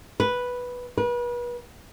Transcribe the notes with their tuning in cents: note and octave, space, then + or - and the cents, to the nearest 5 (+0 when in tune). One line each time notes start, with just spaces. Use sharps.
B4 -5
B4 -35